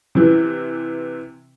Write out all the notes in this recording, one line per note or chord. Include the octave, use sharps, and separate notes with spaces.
C3 E3